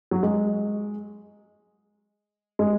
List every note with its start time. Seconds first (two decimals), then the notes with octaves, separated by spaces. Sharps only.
0.11 F#3
0.23 G#3
2.59 G#3